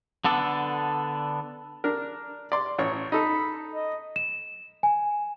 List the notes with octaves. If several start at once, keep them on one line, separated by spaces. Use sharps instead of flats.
D3 B3 D4 A4
D4 A#4
D5 C6
A1 C#5 C#6
D#4 A4 B5
D#5
E7
G#5